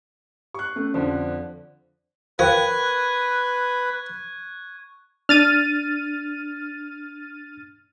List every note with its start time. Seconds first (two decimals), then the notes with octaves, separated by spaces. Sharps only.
0.54 G4 C#6 F#6
0.76 A3 C#4
0.94 F2 D3 F3 C5 D5
2.39 F3 A#4 B4 F5 G5 C#6 F#6 G#6
5.29 D4 F6 A6 D#7